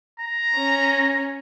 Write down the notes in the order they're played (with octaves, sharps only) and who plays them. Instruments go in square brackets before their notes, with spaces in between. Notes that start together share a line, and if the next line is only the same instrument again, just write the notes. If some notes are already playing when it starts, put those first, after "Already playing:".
[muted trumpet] A#5
[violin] C#4